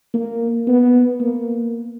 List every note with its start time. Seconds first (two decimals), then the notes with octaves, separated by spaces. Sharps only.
0.14 A#3
0.68 B3
1.20 A#3